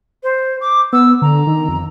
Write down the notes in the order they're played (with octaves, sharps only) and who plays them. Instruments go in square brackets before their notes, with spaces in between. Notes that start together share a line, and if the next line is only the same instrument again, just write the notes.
[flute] C5
D6
[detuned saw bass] B3 [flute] E6
[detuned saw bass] D3 [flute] A#5
[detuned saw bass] D#3
F2